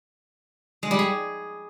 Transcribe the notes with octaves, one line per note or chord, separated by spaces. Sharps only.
G#3
G3
G#4